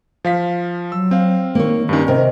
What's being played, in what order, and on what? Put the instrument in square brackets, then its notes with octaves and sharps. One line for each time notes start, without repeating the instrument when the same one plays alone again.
[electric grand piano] F3 F5 B6
[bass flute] F#3 [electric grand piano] E6
[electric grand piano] C4 F5
[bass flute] D#3 [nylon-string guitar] A#3 C#5
[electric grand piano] G2 D#3 [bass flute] C#4
[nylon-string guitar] C3 [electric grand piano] A#4 [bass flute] D#5